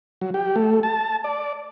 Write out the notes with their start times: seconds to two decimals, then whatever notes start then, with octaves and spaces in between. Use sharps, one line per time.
0.21 F#3
0.34 G4
0.56 A3
0.83 A5
1.24 D5